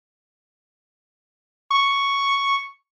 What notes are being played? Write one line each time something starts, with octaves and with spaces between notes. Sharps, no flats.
C#6